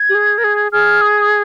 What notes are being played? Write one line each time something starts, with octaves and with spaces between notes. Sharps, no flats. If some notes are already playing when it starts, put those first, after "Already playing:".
Already playing: G#6
G4
G#4
A#4
G#4
G#4 F6
D#6